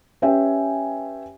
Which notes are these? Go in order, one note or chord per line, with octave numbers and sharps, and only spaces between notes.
C#4 G4 B4 E5 G5 G#5